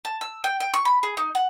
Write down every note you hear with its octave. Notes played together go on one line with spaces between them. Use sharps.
A5
E6
G5
G5
C#6
B5
G#4
D#4
F#5